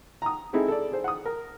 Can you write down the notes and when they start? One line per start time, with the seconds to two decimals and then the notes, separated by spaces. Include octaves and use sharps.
0.22 A#5 D#6
0.53 G#3 C4 D#4 E4 G#4 A4
0.68 A4 D5
0.92 G#4 C5
1.04 F#5 D#6
1.26 A#4